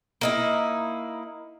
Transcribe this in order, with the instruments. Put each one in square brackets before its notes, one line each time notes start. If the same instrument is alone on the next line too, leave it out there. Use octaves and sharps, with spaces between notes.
[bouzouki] A#3 D#4 E4